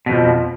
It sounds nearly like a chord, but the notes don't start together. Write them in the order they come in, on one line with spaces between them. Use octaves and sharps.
B2 F2 F3